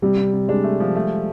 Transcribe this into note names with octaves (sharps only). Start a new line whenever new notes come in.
C3 G3
C3
C3
G#3 D4
A3
F3
A3